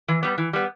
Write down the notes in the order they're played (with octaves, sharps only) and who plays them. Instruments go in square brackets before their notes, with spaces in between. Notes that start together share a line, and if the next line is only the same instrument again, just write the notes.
[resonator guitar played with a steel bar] E3
G3 B3
E3
G3 B3